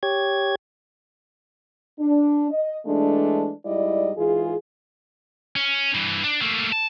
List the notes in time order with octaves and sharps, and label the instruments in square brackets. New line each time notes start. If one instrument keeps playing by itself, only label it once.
[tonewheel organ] G4 C#5 G#6
[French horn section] D4
D#5
E3 G#3 A3 D4
G#2 G3 E4 D5 D#5
G#2 E3 F4 G#4
[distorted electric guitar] C#4
G2 E3
D4
A3 A#3
A5